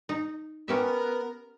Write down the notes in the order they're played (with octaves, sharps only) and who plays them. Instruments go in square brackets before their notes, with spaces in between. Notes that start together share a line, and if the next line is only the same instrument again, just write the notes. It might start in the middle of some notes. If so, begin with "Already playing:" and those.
[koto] D#4
[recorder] B3 [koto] C#4 G4 E5 [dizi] A#4